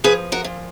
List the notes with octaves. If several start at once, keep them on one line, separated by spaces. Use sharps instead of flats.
F3 G#4 B4
F#4 A#4
A#2